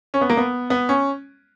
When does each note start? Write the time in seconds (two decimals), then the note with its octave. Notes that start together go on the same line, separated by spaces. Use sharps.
0.14 C#4
0.21 B3
0.29 A#3
0.37 B3
0.70 B3
0.89 C#4